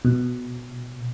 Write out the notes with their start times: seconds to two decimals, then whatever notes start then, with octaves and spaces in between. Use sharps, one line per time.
0.05 B2